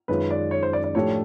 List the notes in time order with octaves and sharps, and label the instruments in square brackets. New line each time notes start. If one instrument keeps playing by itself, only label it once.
[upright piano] F#2 D#3 G#3 C#4 F4 [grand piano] B4
[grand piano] D5
C#5
C5
D5
D5
[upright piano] A2 F3 A3 D4 G4 [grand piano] C#5